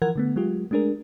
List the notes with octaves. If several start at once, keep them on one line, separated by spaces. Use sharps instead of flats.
E3 F3 A#4 F#5 G#6
D3 A3 B3
F#3 G#3 F4 G4
G#3 A3 D4 G#4 A#4